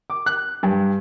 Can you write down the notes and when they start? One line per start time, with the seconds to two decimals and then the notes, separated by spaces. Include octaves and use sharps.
0.10 D6
0.26 F#6
0.63 G2